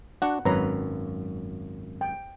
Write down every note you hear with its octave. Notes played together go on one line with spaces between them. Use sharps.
D4 F#4 F#5
G#1 F#2 B4 C#5 A#5
G5